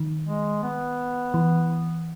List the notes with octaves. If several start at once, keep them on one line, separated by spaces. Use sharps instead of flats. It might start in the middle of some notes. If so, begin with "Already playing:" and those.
Already playing: D#3
G#3
B3
E3